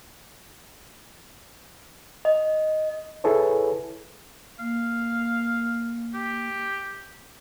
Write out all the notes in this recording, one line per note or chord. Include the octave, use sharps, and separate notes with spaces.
D#5
E4 G#4 A4 B4 C#5
A#3 F5
G4